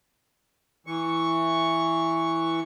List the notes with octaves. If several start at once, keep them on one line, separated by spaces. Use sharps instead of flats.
E3 C#6